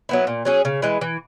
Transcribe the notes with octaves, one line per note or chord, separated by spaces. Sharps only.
F#3 B3 E4
A#2
F#3 C#4 G#4
C#3
E3 G#3
E3